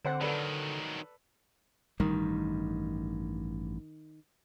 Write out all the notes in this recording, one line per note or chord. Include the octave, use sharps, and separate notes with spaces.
D3 C4 C5 F#5
D#3 F#3 A4 B4 D5
A1 G2 D#3 G3